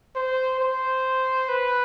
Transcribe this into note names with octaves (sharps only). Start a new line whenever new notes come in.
C5
C5
B4